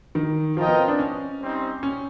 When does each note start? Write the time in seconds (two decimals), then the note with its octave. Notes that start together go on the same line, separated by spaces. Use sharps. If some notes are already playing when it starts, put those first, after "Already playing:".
0.15 D#3
0.57 F3 F4 A#4 D#5 G5
0.67 B3
0.77 C4
0.88 D4
0.99 C#4
1.40 G3 C4 D#4
1.83 C#4